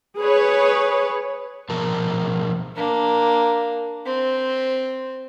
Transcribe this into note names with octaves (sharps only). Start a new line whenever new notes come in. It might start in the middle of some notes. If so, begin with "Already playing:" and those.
G#4 B4 C#5
B2 F3 A#4 A5
A#3 D4
C4